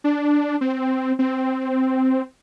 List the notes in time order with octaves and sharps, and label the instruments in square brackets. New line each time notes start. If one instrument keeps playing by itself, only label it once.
[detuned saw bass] D4
C4
C4